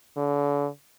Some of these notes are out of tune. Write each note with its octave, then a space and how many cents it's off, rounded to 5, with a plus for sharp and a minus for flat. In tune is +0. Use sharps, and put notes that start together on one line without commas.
D3 -40